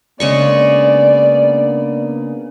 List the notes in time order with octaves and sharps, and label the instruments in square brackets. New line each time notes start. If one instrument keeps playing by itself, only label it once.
[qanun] C#3 G#3 C#6 [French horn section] A#3 B3 D4 [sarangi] D5